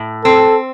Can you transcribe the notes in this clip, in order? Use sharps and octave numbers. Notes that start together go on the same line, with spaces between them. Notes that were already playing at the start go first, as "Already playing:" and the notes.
Already playing: A2
C4 A4